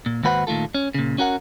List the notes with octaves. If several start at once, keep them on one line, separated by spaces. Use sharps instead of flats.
A#2
D#2 G#2 F#4 B4 C5 F#5
A#2 D#3 A3 F4 A4
C#4
A#2 C#3
C#4 F#4 A#4 F#5